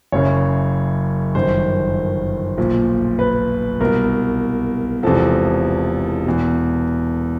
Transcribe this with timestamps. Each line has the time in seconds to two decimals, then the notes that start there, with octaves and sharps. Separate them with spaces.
0.12 F#1 F#2 C#3 C#5
1.35 G1 F#2 D#3 C5
2.58 B1 A#2 F3
3.19 B4
3.80 C2 B2 A#4
5.03 E1 E2 C3 F3 A4
6.26 E2 B2